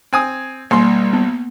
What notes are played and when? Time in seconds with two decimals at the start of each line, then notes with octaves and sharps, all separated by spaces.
0.13 C4 G#5 D#6
0.71 B1 G3 A#3 C6
1.13 B3